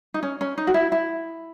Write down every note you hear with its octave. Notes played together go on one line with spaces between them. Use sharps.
D#4
C#4
C#4
D#4
F#4
E4
E4